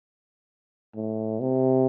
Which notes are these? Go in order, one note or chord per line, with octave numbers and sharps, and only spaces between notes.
A2
C3